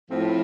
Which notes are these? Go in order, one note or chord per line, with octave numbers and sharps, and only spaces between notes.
A2 F3 C4